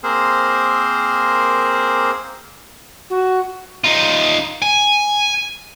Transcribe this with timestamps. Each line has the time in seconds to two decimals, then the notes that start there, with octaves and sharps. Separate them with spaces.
0.03 A#3 C4 G#4 A#4 C5
3.10 F#4
3.84 D#4 F4
4.62 G#5